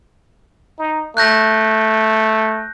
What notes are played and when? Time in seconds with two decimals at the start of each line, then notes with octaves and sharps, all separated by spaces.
0.79 D#4
1.17 A3 F#6 G6 A#6